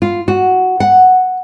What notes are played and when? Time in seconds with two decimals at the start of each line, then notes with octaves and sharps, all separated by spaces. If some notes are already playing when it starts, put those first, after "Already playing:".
0.02 F4
0.28 F#4
0.80 F#5